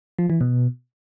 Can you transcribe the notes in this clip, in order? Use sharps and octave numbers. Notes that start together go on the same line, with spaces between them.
F3
E3
B2